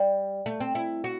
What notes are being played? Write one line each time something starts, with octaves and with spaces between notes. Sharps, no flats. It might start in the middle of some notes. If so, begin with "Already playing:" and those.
Already playing: G3
A3
C4
E4
F#4